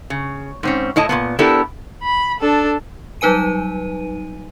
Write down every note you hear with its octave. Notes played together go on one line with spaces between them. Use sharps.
C#3
G#2 C4 C#4
A2 E4 D#5 A5
A#2 G3 B3
B3 D4 E4 G4 A4 A#4
B5
D4 A4
F#3 G3 D#4 B4 G#5 D#7